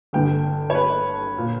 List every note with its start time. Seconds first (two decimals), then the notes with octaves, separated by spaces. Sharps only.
0.13 G1 G2 D3 G5
0.70 C#5
0.75 B4
1.38 A#2